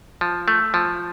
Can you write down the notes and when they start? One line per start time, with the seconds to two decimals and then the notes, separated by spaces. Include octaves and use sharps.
0.21 F3
0.48 A3
0.74 F3